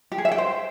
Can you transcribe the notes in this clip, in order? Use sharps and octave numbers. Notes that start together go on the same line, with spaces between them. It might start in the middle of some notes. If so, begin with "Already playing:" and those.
G4
G#4
E5
G5
C5